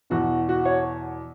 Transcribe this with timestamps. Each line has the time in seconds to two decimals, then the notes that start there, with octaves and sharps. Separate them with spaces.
0.10 E2 B2 F#4
0.49 F#4
0.65 C#5